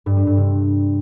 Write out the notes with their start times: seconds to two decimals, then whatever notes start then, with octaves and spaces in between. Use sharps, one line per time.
0.06 G2
0.16 G3
0.27 G2
0.37 C3